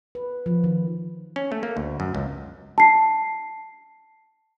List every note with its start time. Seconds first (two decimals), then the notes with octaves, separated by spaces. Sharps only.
0.15 B4
0.46 F3
0.64 D#3
1.36 C#4
1.52 A3
1.63 A#3
1.77 D2
2.00 F#2
2.15 C#2
2.78 A5 C7